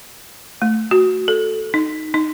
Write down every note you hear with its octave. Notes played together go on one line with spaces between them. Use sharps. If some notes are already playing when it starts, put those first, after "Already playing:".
A3
F#4
A4
D#4
D#4